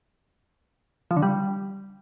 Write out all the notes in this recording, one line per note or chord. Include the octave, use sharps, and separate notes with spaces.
F3
D3
G3